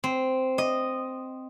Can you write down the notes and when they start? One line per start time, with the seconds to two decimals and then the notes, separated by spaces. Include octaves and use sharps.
0.04 C4
0.58 D#5